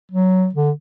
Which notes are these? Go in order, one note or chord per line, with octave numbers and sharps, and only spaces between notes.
F#3
D3